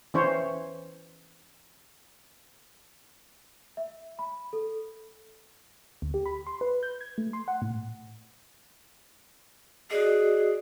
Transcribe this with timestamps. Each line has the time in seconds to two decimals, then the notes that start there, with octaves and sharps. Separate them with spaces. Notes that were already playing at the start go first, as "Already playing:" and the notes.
0.14 E3 C#4 C5 C#5
3.77 E5
4.19 B5
4.53 A4
6.02 D2
6.14 G4
6.26 B5
6.47 C6
6.61 B4
6.83 G6
7.01 G#6
7.18 A3
7.33 C6
7.48 F#5
7.62 A2
9.91 F#4 G#4 D5 D#5